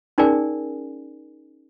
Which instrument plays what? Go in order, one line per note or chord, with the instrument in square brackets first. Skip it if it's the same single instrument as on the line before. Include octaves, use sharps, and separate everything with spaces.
[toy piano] C#4 D#4 G#4 A#4 D5 G#5